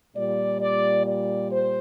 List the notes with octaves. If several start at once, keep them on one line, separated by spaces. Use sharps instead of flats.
A#2 G3 D5
D5
D5
C5